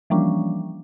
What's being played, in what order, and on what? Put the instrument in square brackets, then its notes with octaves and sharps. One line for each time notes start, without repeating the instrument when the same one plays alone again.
[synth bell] E3 F3 G3 A#3 C#4 D4